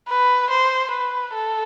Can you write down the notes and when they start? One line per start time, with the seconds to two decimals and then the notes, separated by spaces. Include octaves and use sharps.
0.08 B4
0.50 C5
0.91 B4
1.34 A4